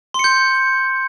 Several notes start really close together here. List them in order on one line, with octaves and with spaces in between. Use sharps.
C6 C#7 G6